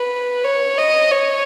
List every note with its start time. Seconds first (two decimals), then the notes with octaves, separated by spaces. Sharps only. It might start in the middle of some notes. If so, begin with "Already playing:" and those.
Already playing: B4
0.44 C#5
0.78 D#5
1.12 C#5